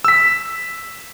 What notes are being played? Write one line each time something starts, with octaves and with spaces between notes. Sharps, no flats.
E6 B6